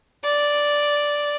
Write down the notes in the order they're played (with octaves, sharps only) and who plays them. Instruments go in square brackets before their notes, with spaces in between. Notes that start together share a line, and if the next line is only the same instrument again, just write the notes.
[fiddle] D5